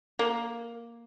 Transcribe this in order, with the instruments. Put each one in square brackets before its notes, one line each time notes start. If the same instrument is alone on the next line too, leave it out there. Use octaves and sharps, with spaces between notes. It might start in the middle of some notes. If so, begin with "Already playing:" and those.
[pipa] A#3